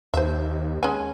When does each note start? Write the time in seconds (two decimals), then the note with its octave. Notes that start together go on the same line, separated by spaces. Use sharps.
0.14 D#2 C5 E5
0.83 G#3 C#4 G#5